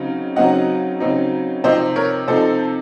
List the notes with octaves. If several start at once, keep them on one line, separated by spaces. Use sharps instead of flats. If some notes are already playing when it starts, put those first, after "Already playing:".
Already playing: C#3 F#3 C4 D#4
C#3 F#3 C4 D#4 D#5 F#5
C#3 F#3 C4 D#4
C3 F3 C4 D#4 C5 D#5
A#4 C#5
C3 F3 C4 D#4 A4 C5